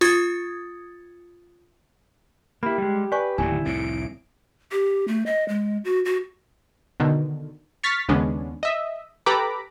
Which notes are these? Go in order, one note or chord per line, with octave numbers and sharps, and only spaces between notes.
F4 D#6 G#6 A6 C#7
A#3 E4 G4 B5
G3 G#3
B4 D5 G#5 C#6
D1 D#2 D3 E4 G#5
C2 F2 A2 D7
G4
A3
D#5
G#3
F#4
F#4
B2 D3 D#3
C#6 F6 A6 B6
D#2 C#3 G#3 B3 C#4 D4
D#5 E5
G4 A4 B4 A#5 B5 D6